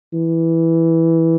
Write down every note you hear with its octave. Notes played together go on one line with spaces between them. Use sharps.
E3